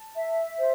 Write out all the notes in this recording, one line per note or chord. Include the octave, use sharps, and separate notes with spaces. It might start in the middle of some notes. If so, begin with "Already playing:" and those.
Already playing: A5
E5
C5